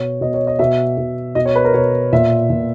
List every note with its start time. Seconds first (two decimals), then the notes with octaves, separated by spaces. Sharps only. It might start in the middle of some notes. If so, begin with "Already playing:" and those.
Already playing: B2 C#5
0.21 B2 D#5
0.34 C#5
0.47 D#5
0.59 B2 E5
0.98 B2
1.35 B2 D#5
1.46 C#5
1.56 B4
1.65 A#4
1.74 B2 C#5
2.13 A#2 E5
2.50 A#2